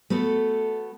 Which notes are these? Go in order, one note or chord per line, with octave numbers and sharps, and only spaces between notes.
A3 B3 F#4 A4